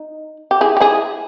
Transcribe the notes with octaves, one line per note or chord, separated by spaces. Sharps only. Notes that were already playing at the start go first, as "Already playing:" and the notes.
Already playing: D#4
G4
E4 G#4
G4
E4 G#4